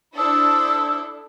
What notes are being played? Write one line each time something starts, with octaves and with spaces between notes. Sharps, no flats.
D4 E4 A4 C5 D#6 E6